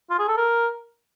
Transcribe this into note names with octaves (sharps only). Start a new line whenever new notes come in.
F4
G#4
A4
A#4